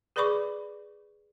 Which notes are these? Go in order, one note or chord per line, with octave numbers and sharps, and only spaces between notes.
G#4 B4 D5 B5 C#6 D6